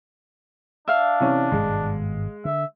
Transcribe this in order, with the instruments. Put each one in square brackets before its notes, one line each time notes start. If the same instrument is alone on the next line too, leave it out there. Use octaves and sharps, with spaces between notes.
[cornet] D4 [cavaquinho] E5 F5
[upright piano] C3 E3 C#4
[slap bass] G#1 G2 B2 [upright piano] G#3
[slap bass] D3 [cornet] E5